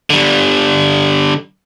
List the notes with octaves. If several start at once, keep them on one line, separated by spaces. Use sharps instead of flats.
D3 G3